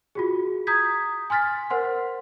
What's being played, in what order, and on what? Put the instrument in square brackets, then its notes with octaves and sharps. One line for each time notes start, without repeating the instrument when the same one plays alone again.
[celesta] F4 F#4 G#4
A#5 D#6 G6 G#6 B6
G#5 C6 F6 A6 B6
A#4 C5 F#5 C6